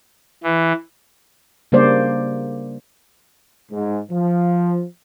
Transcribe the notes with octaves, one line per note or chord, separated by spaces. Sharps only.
E3
C#3 G3 A#3 D4 C5 D5
G#2
F3